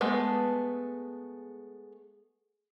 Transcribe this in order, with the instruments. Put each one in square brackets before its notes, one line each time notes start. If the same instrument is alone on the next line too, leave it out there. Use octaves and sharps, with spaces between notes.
[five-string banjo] G#3 A3 B3